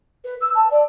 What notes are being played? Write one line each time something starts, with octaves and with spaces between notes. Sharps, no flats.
B4
E6
A5
D5